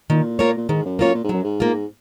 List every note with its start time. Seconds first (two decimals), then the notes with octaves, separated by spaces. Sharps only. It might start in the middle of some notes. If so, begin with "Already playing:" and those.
0.10 A#2 D#3
0.39 A#3 F4 A#4 C#5
0.57 A#2
0.69 G#2 D#3
0.85 F#2
0.99 F#2 A#3 F4 A#4 C#5
1.14 A#2
1.24 G#2
1.29 F#2 F#3
1.44 G#2
1.60 A#3 F4